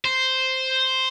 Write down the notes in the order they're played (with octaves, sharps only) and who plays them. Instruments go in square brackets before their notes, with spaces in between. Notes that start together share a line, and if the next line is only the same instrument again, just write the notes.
[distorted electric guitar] C5